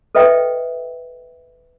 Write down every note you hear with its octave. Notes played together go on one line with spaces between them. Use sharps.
A4 B4 D#5 E5 G5